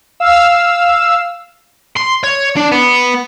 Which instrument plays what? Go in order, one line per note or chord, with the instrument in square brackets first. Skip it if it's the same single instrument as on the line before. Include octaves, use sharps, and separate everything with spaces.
[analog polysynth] F5 E6
[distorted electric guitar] C6
C#5
D4
B3